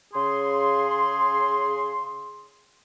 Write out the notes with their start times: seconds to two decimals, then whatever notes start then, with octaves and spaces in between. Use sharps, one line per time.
0.14 C#3 G#4 C6